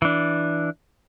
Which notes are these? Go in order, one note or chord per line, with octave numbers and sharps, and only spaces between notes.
E3 D4